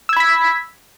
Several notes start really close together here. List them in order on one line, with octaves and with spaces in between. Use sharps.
E6 G#6 B5 B6